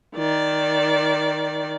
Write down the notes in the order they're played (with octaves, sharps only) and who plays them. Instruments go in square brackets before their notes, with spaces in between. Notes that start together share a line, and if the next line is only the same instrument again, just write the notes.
[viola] D#3 D5